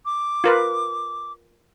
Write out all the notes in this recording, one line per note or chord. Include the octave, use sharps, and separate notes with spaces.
D6
F4 A#4 B4